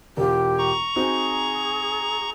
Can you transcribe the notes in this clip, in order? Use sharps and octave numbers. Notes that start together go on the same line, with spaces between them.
E1 F4 G4
A#5 C#6
C4 D#4 F#4 G#4